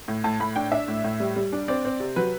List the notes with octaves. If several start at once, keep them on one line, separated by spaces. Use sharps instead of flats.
A2
A2 A5
A2 B5
D4 G5
D4 E5
A2
A2
G3
G3
D4
C4 D5
C4
C3
F#3 B4